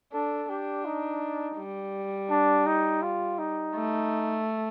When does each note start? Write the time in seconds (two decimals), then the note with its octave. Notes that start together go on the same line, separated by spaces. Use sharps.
0.13 D4 A4
0.49 D4 G4
0.85 D#4
1.58 G3
2.30 D4
2.67 D#4
3.02 F4
3.39 D#4
3.75 A3